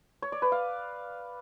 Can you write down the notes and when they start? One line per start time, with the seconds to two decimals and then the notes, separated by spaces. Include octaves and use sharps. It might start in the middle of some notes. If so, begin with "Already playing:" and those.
0.22 C#5
0.32 D5
0.42 B4
0.52 F5